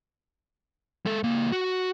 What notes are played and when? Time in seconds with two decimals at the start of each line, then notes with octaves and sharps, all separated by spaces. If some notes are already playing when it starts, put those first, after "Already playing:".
1.06 G#3 A4
1.23 C#2 A#3
1.52 F#4